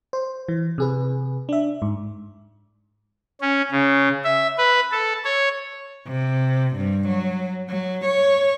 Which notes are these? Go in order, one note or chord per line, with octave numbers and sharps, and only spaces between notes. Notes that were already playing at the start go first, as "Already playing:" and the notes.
C5
E3
C3 G#4 B4
D4 E5
G#2
C#4
C#3
E5
B4
A4
C#5
C3
G2
F#3
F#3
C#5